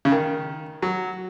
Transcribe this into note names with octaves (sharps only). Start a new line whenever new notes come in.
C#3
D#3
F#3